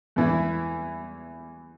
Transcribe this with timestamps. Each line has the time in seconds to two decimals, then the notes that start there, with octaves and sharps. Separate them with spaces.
0.16 E2 E3 B3 E4